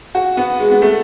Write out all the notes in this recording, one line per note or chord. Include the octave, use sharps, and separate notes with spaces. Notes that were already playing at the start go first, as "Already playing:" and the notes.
F#4
B3
G#3
B3
A3